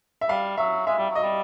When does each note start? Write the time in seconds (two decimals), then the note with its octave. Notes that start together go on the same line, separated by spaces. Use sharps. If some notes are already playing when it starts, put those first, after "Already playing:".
0.21 E5
0.29 G3 F5
0.57 F#3 E5
0.87 G#3 E5
0.98 G3
1.10 F#3
1.15 D#5
1.23 G3